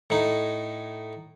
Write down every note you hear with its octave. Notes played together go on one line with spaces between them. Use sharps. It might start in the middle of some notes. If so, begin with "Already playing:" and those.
A2 D#4